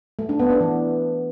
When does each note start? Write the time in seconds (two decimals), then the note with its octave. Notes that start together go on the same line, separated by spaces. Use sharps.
0.19 A3
0.29 D4
0.40 B3
0.50 D4
0.60 E3